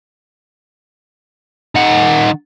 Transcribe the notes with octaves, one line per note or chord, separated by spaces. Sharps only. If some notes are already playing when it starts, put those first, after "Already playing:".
D#3 F#5